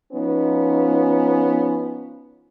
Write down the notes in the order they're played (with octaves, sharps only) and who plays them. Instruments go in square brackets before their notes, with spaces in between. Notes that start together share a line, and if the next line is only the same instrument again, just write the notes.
[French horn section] F3 B3 C#4 D#4